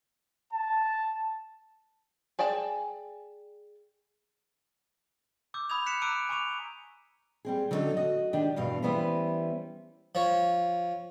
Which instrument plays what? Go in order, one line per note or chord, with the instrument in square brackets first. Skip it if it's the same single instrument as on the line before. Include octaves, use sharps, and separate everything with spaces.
[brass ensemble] A5
[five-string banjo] G#4 D5 G5 A5
[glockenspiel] D6 E6 G6
B5 D#6 E6 G6 G#6 F7
F#6 B6 C#7 E7
A#5 D6 E6 F#6 D7 D#7
G#5 A#5 C#6 D6 D#7 F7
[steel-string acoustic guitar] G3 C4 G#4
D3 F#3 B3 C#4 D#4 A4
F#4 D#5
D#3 D4 G4
E2 G2 B2 F5
E3 G3 B3 C#4 B4 C5
[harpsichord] F3 C#5